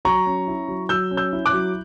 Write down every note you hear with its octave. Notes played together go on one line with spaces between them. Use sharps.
F#3 A#5 C#6
C#4
E4
F#3
F#3 E6 G6
C#4
E6 G6
E4
D6 F#6
F#3